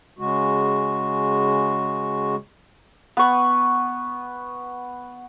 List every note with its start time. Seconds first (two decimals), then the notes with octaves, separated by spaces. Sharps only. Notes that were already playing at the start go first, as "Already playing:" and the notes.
0.19 C#3 G#3 F#4
3.17 B3 C#6